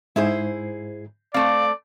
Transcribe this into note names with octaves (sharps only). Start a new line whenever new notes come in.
G#2 E4 G#4 C5
A3 C4 D5 F5